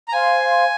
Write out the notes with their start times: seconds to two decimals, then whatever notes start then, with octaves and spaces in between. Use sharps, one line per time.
0.08 A#5
0.12 C5 F5 G#5 C6